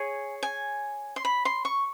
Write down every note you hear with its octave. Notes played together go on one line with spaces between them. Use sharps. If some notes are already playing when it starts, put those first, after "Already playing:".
Already playing: G#4 C#5 G#5
G#5
C6
B5
C6
C#6